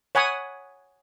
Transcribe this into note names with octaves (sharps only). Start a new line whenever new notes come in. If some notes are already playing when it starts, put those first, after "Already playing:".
C#5 F#5 G#5 B5 D#6